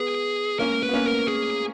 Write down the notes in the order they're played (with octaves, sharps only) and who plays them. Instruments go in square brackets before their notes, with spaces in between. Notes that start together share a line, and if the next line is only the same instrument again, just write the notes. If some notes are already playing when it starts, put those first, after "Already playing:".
Already playing: [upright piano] B3 [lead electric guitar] G#4
[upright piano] A#3 C#4 [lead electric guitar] A#4
[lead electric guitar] B4
[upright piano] B3
A#3 C#4
[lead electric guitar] A#4
G#4